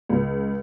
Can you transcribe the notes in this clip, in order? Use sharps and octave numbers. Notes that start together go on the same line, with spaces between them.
C#2